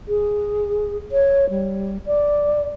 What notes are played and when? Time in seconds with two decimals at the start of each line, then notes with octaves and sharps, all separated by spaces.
0.08 G#4
1.12 C#5
1.50 G3
2.06 D5